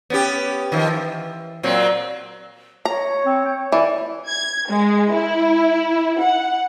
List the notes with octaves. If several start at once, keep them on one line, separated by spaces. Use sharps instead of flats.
B3 C#4 G4
D#3 F3
E3
A#2 F#3 C4
C#5 A#5
C4
G5
E3 D5
G#6
G#3
E4
F#5